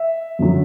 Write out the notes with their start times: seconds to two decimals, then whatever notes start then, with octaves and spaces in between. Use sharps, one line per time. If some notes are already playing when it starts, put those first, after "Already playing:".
Already playing: E5
0.39 F#2 D3 F#3